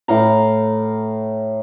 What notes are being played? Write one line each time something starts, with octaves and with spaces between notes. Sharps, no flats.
A2 F5 A#5